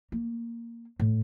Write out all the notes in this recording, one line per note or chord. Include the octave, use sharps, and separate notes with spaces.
A#3
A2